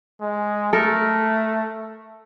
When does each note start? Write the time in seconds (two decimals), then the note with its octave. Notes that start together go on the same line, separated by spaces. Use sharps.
0.21 G#3
0.73 A3 A4 A#4